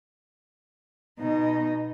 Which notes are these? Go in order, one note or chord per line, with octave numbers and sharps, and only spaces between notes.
B2 D#4